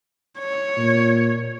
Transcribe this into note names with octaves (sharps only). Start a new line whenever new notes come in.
C#5
A#2